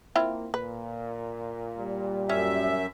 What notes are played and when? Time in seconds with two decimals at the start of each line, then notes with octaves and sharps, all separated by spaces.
0.15 A#3 C4 E4 F4
0.54 A#2 B4
1.77 G3
2.29 F#2 C#4 E5